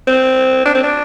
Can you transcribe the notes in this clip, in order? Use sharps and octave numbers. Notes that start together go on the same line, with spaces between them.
C4
D4
C4
D4